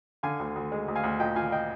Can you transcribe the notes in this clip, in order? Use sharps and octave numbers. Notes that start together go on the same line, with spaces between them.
D3 F5 G#5
D2
D2
G#3
D2
F5 G#5
D2
A#2 D#5 G5
A#2 F5 G#5
D#5 G5